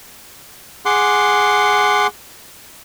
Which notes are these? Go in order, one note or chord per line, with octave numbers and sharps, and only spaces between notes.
G#4 F#5 C6 D6